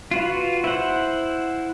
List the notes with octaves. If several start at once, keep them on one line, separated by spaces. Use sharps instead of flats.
F4 F#4 B4
E4 C5 F#5